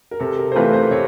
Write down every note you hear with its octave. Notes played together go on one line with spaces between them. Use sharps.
A#4
C3 A4
A#4
C5
E3 A3 C4 F4 B4
C5
C3 C#5